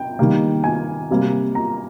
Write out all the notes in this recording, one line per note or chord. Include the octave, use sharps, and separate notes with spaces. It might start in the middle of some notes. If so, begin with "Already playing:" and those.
Already playing: G5
D#3 G3 A#3
G#5
C3 G3 A#3
A#5